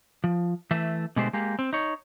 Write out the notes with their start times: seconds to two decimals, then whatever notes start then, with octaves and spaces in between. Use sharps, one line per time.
0.24 F3
0.71 E3 A3 E5
1.16 B2 D3 G#3 A3 G4 C5
1.33 G#3 A#3 G4
1.59 C4
1.73 D#4 C#5